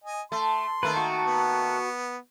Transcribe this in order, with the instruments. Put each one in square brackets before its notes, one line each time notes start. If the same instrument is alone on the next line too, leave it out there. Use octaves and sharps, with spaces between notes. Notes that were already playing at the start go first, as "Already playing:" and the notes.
[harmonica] D#5 G#5
[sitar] A3 [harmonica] C6
[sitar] D#3 A3 A#3 [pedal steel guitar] B4
[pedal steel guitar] F#4
[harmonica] B3